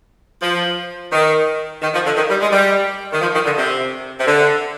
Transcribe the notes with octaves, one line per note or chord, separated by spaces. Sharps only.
F3
D#3
D#3
F3
D3
D#3
G3
G#3
G3
D#3
F3
D#3
D3
C3
C3
D3